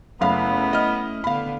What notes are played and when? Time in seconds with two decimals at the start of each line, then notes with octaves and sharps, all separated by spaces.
0.21 F#1 A3 B3 C#4 E4 F5 B5
0.73 D#5 F6
1.24 D3 B3 F5 B5